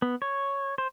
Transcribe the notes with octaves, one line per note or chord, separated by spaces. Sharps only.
B3
C#5
C5